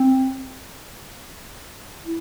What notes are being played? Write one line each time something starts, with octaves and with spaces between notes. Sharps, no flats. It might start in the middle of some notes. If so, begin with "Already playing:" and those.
Already playing: C4
E4